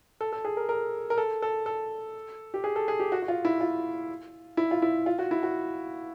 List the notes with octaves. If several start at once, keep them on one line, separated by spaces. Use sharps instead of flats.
A4
A4
G#4
A#4
A#4
A#4
A4
A4
A4
G4
G#4
A4
G#4
G4
F#4
F#4
F4
E4
F4
E4
F4
E4
F4
F#4
E4
F#4